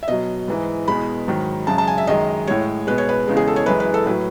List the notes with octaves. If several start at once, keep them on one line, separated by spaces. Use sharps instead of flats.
E5
B2 F#3 D#5
G#2 E3 G#3
E2 B2 G#3 B5
G#2 D#3 F#3
F#2 C#3 G#3 A5
A5
G#5
E5
F#2 D#3 G#3 D#5
A2 G#3 C#5
B2 G#3 B4
C#5
B4
E2 C#3 G#3
G#4
A4
C#5
F#2 E3 G#3 B4
B4
A4
A2 F#3 B4